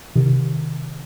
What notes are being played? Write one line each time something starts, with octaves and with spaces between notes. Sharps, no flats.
C3 D#3